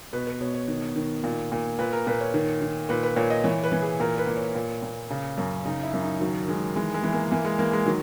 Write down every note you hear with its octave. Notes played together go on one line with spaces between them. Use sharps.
B2 B4
B4
B2 C#5
C#5
D#3
D#3
A#2
A#2
A#2 B4
A#4
A#2 B4
C#5
D#3
D#3
A#2 B4
B4
A#2 C#5
D#5
E3 C#5
B4
E3
G#4
A#2 A#4
B4
A#2
C#5
A#2
A#2
C#3
F#2
C#3 D#4
E4
F#2
D#4
D#3 F#3
D#3 G#3
E3 G#3
G#3
E3
A#3
E3 A#3
G#3
E3 A#3
G#3
D#3 F#3